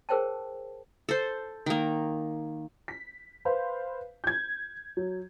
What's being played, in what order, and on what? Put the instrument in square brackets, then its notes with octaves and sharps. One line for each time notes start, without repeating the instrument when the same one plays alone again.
[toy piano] G#4 A#4 C5 C#5 G5 A5
[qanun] A4 C5
D#3 A#3
[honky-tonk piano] B6
B4 C5 F5
G6 G#6
F#3